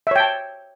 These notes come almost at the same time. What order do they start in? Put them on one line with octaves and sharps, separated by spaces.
E5 C#5 G5 A5